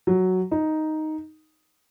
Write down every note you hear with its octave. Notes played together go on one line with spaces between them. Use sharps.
F#3
D#4